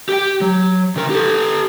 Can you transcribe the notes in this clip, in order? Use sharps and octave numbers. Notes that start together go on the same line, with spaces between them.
G4 G5
F#3
C#3 A#4
G4 A4